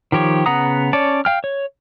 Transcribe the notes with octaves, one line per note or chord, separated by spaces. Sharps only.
D#3 F3 G4 C#5
C#3 B3 F#5 A#5 D#6
C#4 C#5 D5 A5
F5 G5 F6
C#5